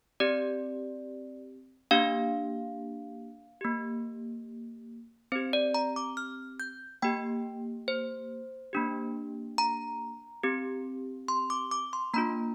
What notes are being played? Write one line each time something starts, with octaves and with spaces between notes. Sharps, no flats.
C4 G4 D5
A#3 D4 G4 F5
A#3 G4
C4 G4 C5
D5
A#5
D6
F6
G6
A#3 G4 G5
C5
A#3 D4 G4
A#5
C4 G4
C6
D6
D6
C6
A#3 D4 F4 A#5